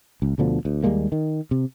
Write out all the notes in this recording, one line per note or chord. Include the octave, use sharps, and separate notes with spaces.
C#2
D2 B2 D3 F3
D2
D#2 G3 G#3 A#3
D#3
C3